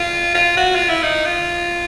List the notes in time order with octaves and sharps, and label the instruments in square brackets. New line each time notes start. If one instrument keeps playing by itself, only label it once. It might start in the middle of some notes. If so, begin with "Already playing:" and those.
Already playing: [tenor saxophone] F4
F4
F#4
F4
E4
D#4
F4